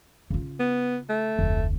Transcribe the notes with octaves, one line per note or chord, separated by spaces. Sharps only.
C#3 F4
B3
A3
F1 D2